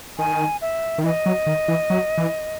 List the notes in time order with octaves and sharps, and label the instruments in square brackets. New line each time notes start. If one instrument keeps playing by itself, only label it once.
[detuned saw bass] D#3 [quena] G#5
[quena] E5
[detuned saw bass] D#3
[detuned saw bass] E3 [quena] D#5
[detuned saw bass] F#3
D#3
E3
F#3
E3